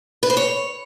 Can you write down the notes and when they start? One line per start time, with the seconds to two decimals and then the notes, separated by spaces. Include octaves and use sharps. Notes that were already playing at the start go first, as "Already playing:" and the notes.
0.23 B4
0.30 C5
0.37 C#5